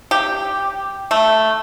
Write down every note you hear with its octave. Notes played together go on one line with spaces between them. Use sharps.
G4
A3